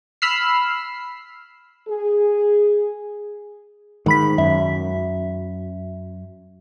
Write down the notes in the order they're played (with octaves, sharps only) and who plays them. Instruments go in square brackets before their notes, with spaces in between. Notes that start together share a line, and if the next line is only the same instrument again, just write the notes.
[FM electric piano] B5 E6 F6 C7
[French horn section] G#4
[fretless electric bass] G#2 [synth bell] D#3 B5 B6
[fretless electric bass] F#2 [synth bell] E5